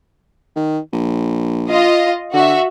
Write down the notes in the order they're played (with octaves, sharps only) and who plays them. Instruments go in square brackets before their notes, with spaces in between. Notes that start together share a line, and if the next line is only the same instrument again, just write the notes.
[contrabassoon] D#3
A#1
[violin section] F4 D#5
[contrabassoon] D3 [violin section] F#4 E5